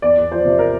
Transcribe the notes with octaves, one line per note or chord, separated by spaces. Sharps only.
E2 D5
E2
F3 C5
C3
A#4